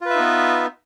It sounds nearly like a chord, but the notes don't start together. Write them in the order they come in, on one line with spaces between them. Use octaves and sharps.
F4 B4 E5 D#4 B3